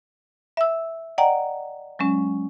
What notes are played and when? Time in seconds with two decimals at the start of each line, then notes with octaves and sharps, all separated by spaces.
0.57 E5 E6
1.18 D5 D#5 F#5 G5 A#5
1.99 F#3 G#3 C#4